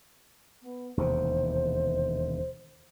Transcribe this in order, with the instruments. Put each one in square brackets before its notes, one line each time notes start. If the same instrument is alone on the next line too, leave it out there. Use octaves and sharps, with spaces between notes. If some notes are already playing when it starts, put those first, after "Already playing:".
[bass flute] B3
[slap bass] E1 D#2 C3 [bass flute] C5